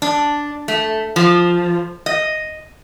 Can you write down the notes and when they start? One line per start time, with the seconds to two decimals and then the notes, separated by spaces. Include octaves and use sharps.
0.02 D4
0.68 A3
1.16 F3
2.06 D#5